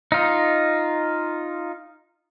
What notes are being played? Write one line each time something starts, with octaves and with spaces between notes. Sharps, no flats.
D#4 F4